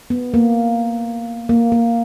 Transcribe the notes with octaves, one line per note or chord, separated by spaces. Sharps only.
B3
A#3
A#3
A#3